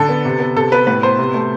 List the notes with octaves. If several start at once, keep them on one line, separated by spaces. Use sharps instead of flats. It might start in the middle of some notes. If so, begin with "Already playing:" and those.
Already playing: D3 A4
B3
C3
B3
C3 A4
B3 B4
A2 B4
B3 C5
C3
A3